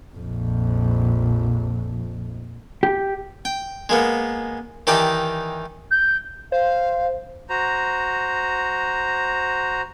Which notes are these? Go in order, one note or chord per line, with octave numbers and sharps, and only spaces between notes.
A#1 F2
G4
G5
G#3 A#3 B3
D#3 E3 D#4 G4 D5 A5
G6
C5 F5
F#4 C5 A#5